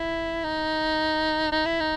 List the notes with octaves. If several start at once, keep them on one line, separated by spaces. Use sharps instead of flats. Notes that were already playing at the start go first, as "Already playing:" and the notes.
Already playing: E4
D#4
D#4
E4
D#4